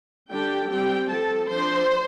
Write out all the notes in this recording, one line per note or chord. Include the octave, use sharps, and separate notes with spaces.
D3 G3 D4 G4 G5
G3 C4 G4 G5
F3 C4 A4 A5
F3 D4 C5 C6